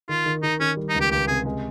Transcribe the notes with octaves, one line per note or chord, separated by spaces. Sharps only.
D#3 F4
D#3
D#3 D#4
D#3 C#4
G3
D#4
C#2
G4
C#2 G4
C3 G#4
G#3